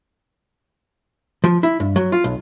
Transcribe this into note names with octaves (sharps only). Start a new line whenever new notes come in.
F3
E4
G2
F#3
F4
B1